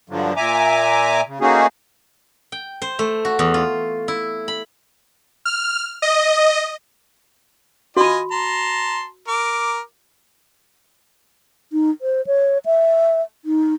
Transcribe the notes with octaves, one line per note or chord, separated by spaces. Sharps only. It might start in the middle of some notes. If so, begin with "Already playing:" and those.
G2 D3 F3 F#3
A#2 E5 G#5 A#5 D6
C#3
A3 A#3 C#4 D#4 F#4 G#4
G5
C5
A3
F#4
E2
F4
E4
B5
F6
D#5
F4 F#4 D#5 G#5 B5
A5 A#5 C6
A#4 D6
D#4
C5
C#5
E5
D#4